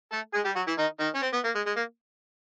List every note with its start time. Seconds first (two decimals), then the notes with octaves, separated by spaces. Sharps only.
0.12 A3 A4
0.34 G#3 G#4
0.45 G3 G4
0.56 F#3 F#4
0.68 E3 E4
0.78 D#3 D#4
1.00 D#3 D#4
1.15 C#4
1.22 C4
1.33 B3
1.44 A#3
1.55 G#3
1.67 G#3
1.77 A#3